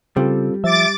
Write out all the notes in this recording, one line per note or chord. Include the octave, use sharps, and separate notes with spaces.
C#3 G3 C4 F4 A4
F3 E5 D6 A6